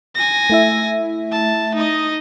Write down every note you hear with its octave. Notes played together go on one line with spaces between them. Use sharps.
G#5 A#6
A3 E4 E5
A5
D#4 D#5